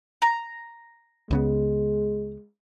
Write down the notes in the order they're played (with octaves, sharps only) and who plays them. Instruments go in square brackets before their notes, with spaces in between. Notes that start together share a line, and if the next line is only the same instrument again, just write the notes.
[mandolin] A#5
[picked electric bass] C#2 C#3 B3 [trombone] G#3